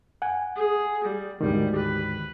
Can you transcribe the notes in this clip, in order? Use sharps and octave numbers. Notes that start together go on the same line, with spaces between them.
F#5 G#5
G#4
G3
D2 G#2 D#3 G3
B4